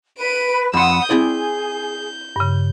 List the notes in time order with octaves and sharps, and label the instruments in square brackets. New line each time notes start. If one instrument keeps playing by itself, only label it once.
[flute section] B4 [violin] D7 D#7
[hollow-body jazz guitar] F2 C6 [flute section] F#5 B5 [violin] D#6 E6
[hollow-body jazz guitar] C4 E4 D5 [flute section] G#4 [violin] G6
[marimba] G2 C#3